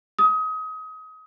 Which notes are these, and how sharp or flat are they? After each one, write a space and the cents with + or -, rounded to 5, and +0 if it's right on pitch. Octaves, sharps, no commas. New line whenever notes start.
D#6 +30